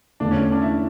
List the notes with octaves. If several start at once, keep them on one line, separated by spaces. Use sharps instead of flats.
E2 D3 A3 D4
C#4
C#4
D4
E4